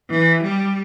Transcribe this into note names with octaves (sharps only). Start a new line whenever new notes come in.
E3
G3